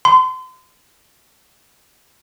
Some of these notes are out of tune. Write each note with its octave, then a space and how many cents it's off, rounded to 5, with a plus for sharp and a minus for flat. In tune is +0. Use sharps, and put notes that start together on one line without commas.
C6 -35